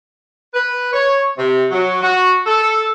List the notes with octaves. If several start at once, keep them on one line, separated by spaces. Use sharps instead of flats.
B4
C#5
C3
F#3
F#4
A4